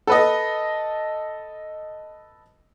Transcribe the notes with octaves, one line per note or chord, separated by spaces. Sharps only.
A4 B4 D#5